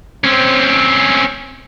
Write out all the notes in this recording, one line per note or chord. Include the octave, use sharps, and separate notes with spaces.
C4 C#4